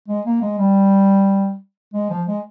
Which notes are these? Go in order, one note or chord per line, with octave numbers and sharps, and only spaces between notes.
G#3
A#3
G#3
G3
G#3
F3
G#3